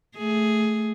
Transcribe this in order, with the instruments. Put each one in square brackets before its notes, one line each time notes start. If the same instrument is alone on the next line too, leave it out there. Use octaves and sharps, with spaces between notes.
[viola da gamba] A3 G#4